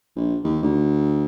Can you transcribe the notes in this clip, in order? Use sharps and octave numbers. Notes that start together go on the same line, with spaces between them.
A#1
D#2
D2